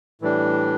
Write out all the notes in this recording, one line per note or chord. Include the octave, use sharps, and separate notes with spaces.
A2 E3 G3 D4